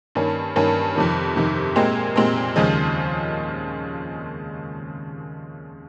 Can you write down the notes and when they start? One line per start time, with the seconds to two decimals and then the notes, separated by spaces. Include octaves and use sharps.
0.15 G2 D#3 A#3 C#4
0.56 G2 D#3 A#3 C#4
0.95 F2 C3 D#3
1.36 F2 C3 D#3
1.76 A#2 G#3 C4 G4 A#4
2.16 A#2 G#3 C4 G4 A#4
2.56 D#2 C#3 F3 G#3